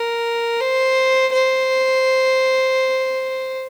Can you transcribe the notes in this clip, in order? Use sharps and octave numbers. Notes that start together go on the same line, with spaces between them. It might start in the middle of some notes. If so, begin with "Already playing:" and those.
Already playing: A#4
C5
C5